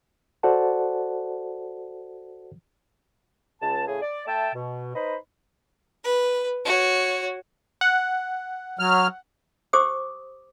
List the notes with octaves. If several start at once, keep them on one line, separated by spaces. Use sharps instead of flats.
F#4 A4 C5 D5 F#5 A5
C#2 A5
A2 C#3 G#4 G#5
D5
A3 E5 G5 A5
B2
D#4 B4 C5 D#5 B5
B4
F#4 C#5
F#5
F#3 F6
G4 C5 D6 D#6